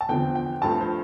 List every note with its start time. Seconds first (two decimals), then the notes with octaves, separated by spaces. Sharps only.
0.01 A5
0.09 E2 D3 F3 C4 G5
0.35 G5
0.62 G2 F3 A3 C4 A5
0.81 C5